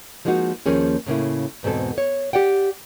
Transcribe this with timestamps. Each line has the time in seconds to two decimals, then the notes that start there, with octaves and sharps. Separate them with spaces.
0.25 F3 G#3 A#3 D#4 F#4
0.66 D#2 F3 A#3 C#4 G#4
1.06 A2 C#3 A#3 E4
1.63 E2 G#2 B2 C4 A4
1.98 C#5
2.33 G4 D5 F#5 G5